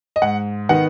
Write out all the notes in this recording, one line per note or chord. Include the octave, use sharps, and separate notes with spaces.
D#5
G#2 F#5
D#3 B3 D#4 F#5